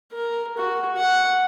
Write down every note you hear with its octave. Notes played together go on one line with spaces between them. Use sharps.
A#4
F#4
F#5